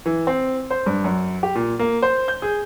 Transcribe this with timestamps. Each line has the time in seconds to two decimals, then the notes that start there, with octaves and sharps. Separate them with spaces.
0.06 E3
0.27 C4
0.71 C5
0.86 G2
1.04 F#2
1.43 G4
1.55 A#2
1.79 A#3
2.02 C5
2.28 G6
2.42 G#4